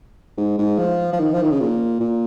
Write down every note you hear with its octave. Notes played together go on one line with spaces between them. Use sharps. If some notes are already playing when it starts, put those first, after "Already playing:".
G#2
G#2
F3
F3
D#3
F3
D#3
C#3
A#2
A#2